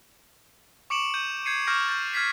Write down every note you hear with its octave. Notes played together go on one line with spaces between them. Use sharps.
C#6 D6 C#7 D7 E7 F#7
G6 D#7
G6 G#6 C7 C#7 D#7
C#6 D6 F6 G6 A#6 D7
G6 A6
F6 G#6 A6 B6 C7